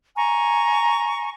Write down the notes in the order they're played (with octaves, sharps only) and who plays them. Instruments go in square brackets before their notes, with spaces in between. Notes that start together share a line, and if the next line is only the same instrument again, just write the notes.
[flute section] G#5 A#5 C#6